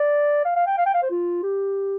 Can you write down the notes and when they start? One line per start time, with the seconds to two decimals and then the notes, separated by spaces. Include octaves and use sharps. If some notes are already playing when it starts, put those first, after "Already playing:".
Already playing: D5
0.45 F5
0.56 F5
0.67 G5
0.78 F5
0.86 G5
0.94 F5
1.02 C5
1.10 F4
1.43 G4